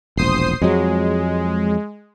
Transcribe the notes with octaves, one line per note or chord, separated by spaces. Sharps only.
E1 A#1 C5 D#6 C7
F2 F#3 G#3